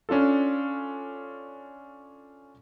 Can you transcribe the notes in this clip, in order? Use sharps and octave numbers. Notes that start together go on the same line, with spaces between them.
C#4 D4 F4 A4